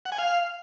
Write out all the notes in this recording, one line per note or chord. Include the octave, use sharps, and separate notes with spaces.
F#5
G#5
F5